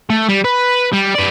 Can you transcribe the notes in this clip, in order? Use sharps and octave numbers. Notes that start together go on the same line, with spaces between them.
A3
G3
B4
G3
B4 D5